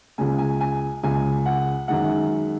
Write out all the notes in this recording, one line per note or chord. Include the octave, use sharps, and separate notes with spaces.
C#2 C#3 G#3 G#5
G#5
G#5
C#2 C#3 G#3 G#5
F#5
F#2 D#3 G#3 F#5